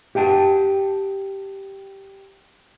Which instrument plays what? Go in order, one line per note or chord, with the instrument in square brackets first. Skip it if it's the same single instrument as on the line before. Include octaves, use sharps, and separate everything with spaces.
[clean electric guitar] G4 F#5 G5 A5